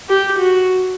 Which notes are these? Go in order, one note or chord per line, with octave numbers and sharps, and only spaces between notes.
G4
F#4